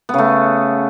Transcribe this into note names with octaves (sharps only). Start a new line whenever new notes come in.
C#3 A3 B3